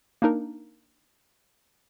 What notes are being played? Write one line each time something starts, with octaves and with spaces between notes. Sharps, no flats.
A#3 D4 D#4 A#4